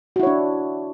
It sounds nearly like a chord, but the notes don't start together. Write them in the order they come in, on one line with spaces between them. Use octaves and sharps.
F#4 E4 C#5 D4